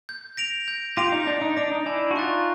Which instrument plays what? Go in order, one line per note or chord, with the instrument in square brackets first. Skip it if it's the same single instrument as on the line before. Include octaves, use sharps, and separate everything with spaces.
[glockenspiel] G6
A#6 D7 F7
G6
[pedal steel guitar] F4 G4 [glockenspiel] A#6 D7 F7
[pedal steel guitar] D#4
[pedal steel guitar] D4 [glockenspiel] G6
[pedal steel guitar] D#4
[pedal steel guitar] D4 [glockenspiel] A#6 D7 F7
[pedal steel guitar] D#4
[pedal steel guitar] D4 E4 [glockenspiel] G#5
[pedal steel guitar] F#4
[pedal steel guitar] D#4 F4 [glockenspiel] C#6 F#6 A6